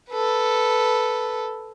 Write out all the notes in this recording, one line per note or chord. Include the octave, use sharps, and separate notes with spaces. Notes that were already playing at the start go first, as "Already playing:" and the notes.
A4 B4